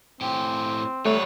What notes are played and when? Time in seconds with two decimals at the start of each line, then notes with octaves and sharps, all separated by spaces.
0.21 A2 C4 G4
1.06 G3 A3 B4 C#5